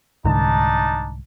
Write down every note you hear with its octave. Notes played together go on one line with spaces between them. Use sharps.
C2 G#2 D3 D4 D#4 A5